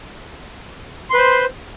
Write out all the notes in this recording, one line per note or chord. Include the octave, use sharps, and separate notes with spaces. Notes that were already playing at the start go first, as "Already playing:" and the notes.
B4 C5 C6